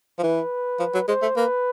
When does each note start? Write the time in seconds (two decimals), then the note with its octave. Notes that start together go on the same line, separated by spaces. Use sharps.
0.19 F3
0.23 E3 B4
0.79 F3
0.94 F#3
1.08 G#3 C5
1.22 A3
1.36 A#3 B4